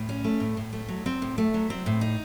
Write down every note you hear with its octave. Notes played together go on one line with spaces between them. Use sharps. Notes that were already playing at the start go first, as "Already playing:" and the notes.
Already playing: A2
C#4
A3
A2
A2
A3
F#3
C4
A2
A3
F#3
C4
A2
D#4